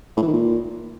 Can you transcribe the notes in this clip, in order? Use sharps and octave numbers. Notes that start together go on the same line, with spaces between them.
A2
E3
D#3
A#2